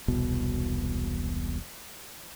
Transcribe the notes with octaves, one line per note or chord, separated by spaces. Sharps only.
E1 C2 B2